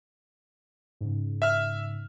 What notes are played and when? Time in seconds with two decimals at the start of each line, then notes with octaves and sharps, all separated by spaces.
1.01 G#2 C#3
1.42 E5 F6